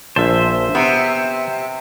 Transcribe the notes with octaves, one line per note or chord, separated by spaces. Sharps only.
A#1 C5 E5 A5
C3 B3